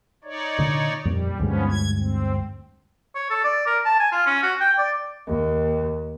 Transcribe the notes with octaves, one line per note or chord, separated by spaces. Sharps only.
D#4 C#5 D5
A#2 D3
F2 A#2 G3
D2 G2 F3 G#3 B3 C#4
G#6
C4
C#5
A4
D5
A#4
A5
G#5
F4
C#4
F#4
G5
D5
D#2